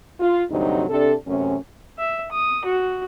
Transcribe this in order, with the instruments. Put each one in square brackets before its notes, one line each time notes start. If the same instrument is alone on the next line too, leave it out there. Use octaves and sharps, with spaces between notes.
[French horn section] F4
D2 G2 C3 F#3 C4 D#4
C3 D4 A4
F#2 C3 A3 C#4
[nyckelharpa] E5
D#6
F#4